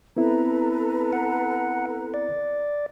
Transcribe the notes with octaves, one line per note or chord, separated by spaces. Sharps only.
B3 C4 E4 A4 B4 A#5
F#5
D5